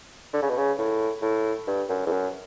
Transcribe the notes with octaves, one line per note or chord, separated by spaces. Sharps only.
D3
C#3
B2
C#3
A2
A2
G2
F#2
E2
F#2